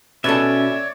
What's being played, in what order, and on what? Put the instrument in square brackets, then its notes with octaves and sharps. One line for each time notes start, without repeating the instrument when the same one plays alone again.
[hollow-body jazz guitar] B2 A4 [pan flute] C#4 [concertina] C#5 D5 [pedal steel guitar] E5